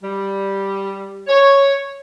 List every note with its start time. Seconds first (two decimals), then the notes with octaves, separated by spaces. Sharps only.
0.03 G3
1.28 C#5